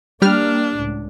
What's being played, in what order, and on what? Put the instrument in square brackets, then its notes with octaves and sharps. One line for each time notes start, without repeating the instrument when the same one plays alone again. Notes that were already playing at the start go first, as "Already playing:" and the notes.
[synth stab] G3 G4 F6 [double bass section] A#3 [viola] D4
[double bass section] C#2 A2